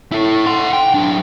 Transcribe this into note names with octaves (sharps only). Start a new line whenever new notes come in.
E4 A4
F#5 C6
G5
F#3 D4